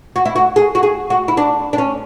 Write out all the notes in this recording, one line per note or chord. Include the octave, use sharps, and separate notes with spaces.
F#4
E4
F#4
G#4
F#4
G#4
F#4
E4
D4
D4
C#4